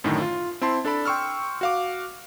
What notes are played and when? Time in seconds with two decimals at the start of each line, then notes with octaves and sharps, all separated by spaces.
0.04 F#2 A2 D3 D#3
0.21 F4
0.61 C4 E4 A5 C6
0.85 D4 A4 D5 B5
1.05 G5 C6 C#6 E6 F6
1.61 F#4 F5 D6